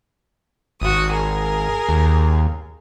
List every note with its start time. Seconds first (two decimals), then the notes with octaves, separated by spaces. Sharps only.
0.82 G#1 F#4 D#6
1.11 G#4 A#4
1.89 D#2